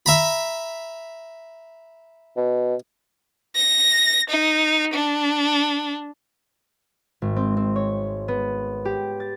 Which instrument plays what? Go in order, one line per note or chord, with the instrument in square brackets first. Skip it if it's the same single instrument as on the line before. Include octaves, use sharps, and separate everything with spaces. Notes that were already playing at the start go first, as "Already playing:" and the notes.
[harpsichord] E5 A#5 B5
[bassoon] B2
[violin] A#6
D#4
D4
[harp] G#1
C4
C4
C#5
B3
G4
A6